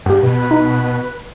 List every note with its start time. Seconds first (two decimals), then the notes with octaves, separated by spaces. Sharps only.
0.06 G2 G4 F#5
0.23 B2 B4
0.51 D#4